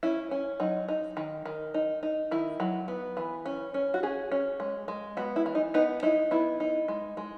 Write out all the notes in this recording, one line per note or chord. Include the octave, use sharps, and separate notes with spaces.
C#4 E4
C#4
F#3 D#4
D#4
D#3
D#3
D#4
D#4
D#3 E4
F#3
B3
E3
C#4
C#4
F#4
C#4 G#4
C#4
G#3
G#3
B3 F#4
E4
E3
D#4
B3 D#4
D#4 E4
B3 E4
D#4
G#3
G#3